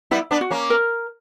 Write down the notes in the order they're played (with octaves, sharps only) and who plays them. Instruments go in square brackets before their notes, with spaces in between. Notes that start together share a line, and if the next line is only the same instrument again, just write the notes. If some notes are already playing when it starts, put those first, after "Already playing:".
[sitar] G3 B3 [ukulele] E4
[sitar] B3 D4
[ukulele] F#4
[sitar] A#3 C#4
[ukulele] A#4